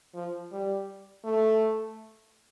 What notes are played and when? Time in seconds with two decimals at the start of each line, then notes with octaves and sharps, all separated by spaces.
0.15 F3
0.52 G3
1.24 A3